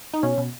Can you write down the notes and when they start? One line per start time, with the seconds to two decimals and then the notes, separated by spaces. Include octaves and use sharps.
0.14 D#4
0.23 B2 C#4
0.38 B2